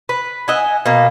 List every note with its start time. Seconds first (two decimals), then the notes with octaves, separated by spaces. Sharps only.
0.09 B4
0.48 D#5 E5 F#5 G#5
0.86 B2 A#3